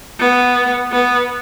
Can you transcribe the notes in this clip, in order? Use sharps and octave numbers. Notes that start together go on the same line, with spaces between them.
B3
B3